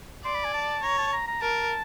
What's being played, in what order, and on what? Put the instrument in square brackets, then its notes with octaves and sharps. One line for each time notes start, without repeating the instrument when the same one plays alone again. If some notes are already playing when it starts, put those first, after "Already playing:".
[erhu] D5 [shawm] C6
[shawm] B5
G#5
A5
[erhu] C#5 [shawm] A#5
[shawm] A5
A#5
A#5
[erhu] A#4 [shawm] A5